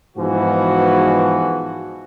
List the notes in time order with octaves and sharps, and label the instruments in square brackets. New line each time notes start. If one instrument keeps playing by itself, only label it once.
[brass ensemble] G#2 B2 E3 F3 F#4